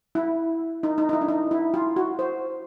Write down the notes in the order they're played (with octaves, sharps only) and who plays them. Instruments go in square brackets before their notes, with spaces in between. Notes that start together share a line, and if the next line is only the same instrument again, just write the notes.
[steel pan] E4
D#4
D#4
D#4
E4
D4
D#4
E4
F4
F#4
C5